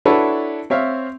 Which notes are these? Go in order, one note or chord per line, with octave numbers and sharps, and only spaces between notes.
D4 E4 F#4 A4 B4 C#5
C4 C#5 E5 F5